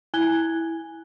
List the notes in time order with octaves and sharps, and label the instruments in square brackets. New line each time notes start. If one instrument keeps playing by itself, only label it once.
[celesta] E4 G#5 F#6 G#6 G7